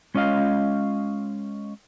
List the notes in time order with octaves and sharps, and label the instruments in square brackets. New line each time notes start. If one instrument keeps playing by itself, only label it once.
[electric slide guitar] G#3 C#4 F4 D#5 F5